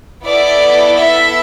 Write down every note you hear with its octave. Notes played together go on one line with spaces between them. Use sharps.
B3 E4 A4 D5
E5